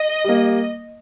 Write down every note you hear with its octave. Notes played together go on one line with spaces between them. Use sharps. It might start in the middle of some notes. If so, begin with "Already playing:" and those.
Already playing: D#5
G3 A#3